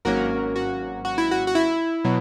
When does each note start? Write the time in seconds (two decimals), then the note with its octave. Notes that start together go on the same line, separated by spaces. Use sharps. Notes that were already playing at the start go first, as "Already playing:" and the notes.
0.05 G#1 G#2 F#3 A#3 C#4 F#4 A#4
0.56 F#4
1.05 F#4
1.18 E4
1.31 F#4
1.47 F#4
1.55 E4
2.05 B2 F#3